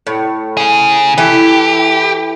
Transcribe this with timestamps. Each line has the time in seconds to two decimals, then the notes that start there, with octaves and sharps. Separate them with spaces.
0.07 A2
0.57 C#3 G#4
1.18 E3 E4 G4 A4